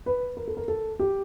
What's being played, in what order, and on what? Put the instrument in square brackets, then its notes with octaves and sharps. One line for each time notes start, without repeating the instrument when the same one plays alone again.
[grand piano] B4
A#4
A4
A#4
A4
G4